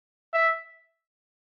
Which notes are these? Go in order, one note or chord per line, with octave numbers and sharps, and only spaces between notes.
E5